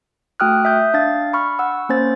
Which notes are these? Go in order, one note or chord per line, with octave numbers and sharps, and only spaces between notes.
A3 F#4 G5 D#6 F6 F#6
E5 D#6 G6
D4 F5 A6
B5 C#6 F6
F#5 E6
A#3 C#4 C5 A6